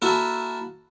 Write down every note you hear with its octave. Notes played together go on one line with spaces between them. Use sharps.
A#3 E4 F#4 A4